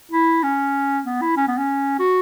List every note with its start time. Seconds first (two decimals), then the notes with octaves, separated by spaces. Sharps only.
0.11 E4
0.43 C#4
1.05 B3
1.21 E4
1.37 C#4
1.48 B3
1.57 C#4
1.99 F#4